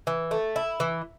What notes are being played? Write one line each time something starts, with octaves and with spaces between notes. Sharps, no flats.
E3
A3
E4
E3